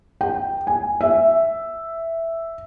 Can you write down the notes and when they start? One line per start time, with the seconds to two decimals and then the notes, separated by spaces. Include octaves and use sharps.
0.21 G5
0.67 G#5
1.01 E5